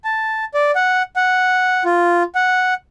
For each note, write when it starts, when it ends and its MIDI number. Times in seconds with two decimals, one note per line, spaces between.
0.05 0.45 81
0.54 0.71 74
0.75 1.03 78
1.16 1.84 78
1.85 2.23 65
2.35 2.74 78